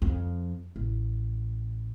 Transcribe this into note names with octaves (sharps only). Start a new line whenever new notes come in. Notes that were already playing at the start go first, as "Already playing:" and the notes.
F2
A1